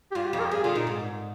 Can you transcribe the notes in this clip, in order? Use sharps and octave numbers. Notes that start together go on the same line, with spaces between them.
G4
G2 F4
G4
F2
A#4
G4
G2 G#4
D3 F4
A#2 D#4
G#2